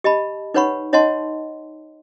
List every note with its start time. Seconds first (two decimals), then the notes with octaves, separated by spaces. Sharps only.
0.04 G4 D#5 A5 B5
0.54 D#4 B4 C#5 F#5 B5 C#6
0.93 D#4 C#5 D#5 F#5 A5 C6